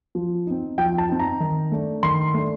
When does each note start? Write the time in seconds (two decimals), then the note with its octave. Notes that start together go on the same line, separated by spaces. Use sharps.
0.15 F3
0.47 C4 D#4
0.78 F3 G5
0.98 A5
1.09 C4 D#4
1.19 A#5
1.40 D#3
1.71 A3 D4
2.03 D#3 C6
2.34 A3 D4